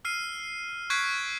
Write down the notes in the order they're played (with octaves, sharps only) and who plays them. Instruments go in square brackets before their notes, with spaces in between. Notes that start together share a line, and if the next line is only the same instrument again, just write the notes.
[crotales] E6 F6 C7 D#7
C#6 F#6 G#6 B6 C7 D7